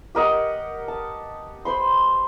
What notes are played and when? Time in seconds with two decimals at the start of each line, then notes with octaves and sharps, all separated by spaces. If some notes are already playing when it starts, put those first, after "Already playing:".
0.15 G4 A#4 D#5 F#5
0.88 A5
1.65 C5 B5 C6